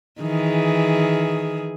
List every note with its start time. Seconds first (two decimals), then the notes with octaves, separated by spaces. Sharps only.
0.21 D#3 E3 G#4